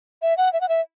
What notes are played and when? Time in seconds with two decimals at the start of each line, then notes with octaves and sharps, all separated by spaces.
0.22 E5
0.37 F#5
0.53 E5
0.61 F#5
0.69 E5